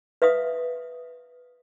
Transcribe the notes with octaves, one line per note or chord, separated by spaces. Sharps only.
B4 E5 F5 D#6